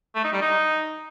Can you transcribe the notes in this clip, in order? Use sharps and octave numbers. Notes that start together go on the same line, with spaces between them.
A3
D#4
G3
D#4